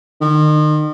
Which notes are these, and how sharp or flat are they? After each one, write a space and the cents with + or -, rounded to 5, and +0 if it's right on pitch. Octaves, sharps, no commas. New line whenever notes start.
D#3 -35